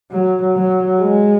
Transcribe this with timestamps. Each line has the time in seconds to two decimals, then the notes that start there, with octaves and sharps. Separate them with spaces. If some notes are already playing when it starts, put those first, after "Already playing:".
0.11 F#3
0.56 F#3
1.00 G#3